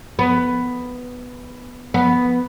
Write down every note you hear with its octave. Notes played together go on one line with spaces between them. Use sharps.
B3
B3